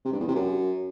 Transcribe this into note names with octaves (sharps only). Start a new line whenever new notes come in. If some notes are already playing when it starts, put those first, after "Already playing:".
C3
G2
E2
C3
F#2